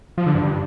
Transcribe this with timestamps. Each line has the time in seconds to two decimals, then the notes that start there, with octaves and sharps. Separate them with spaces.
0.18 F3
0.26 D3
0.35 G2